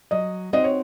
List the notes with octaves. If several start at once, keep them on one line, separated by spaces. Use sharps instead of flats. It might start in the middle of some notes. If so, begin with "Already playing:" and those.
F#3 D#5
C4 D#4 F#4 C5 D#5
C#5